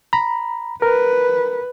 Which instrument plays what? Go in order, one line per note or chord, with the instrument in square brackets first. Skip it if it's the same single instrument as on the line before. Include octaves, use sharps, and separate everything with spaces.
[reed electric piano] A#5 B5
[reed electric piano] A#4 [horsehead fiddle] B4